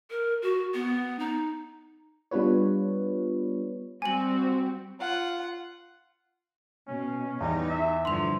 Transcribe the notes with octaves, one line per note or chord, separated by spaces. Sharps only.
A#4
F#4
B3
D#4
G3 B3 D4 F4 B4 C#5
G3 C4 F#4 G#5 F#7
F4 F#5
B2 C#4
E2 G3 D#4
E5
G2 D3 F3 C6 F7